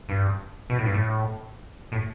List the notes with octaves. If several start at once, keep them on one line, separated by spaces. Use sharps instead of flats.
G2
B2
A2
G2
A2
A2